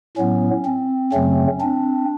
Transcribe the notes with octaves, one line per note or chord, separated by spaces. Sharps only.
A2 F#3 B3 C#4
C4
F#2 C#3 F#3 A3 C4 C#4
C4 D4